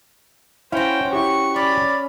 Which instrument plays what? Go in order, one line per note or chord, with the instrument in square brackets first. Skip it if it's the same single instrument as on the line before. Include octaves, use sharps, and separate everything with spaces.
[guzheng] C#4 F#4 [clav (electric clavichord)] E4 F5 [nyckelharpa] C5 G5
[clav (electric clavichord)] E4 G4 [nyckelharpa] C#6
[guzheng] C#4 [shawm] D5 [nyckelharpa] B5